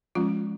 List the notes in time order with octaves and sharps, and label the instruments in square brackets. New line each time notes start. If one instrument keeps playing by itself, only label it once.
[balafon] F3 G#3 C#4 F4